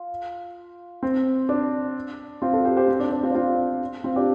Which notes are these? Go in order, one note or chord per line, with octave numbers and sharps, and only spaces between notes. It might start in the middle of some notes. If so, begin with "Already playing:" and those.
Already playing: F4
C4
D4
C4 F4
F4 A4
G4 C5
G4 C5
C4
D4
D4
C4 F4
D4
C4 F4
C4 F4
D4 G4